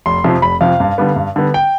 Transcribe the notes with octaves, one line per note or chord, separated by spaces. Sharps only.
F1 C6
F2 C3 F3
F1 B5
F2 C3 F3 F5
G2
D3 G3 B3
G2
D3 G3 B3
G5